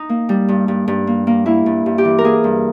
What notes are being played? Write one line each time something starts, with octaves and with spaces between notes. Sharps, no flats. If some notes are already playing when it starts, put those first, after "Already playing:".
Already playing: D#4
A#3
G3
G2
G2
G2
A#3
A#3
A#3 E4
G2
G2
G4
E3
A#4
A#3 G#4
G2